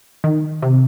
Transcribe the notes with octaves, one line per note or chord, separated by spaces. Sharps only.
D#3
C3